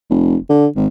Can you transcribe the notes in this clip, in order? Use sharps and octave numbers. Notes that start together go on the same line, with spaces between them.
F1
D3
G#1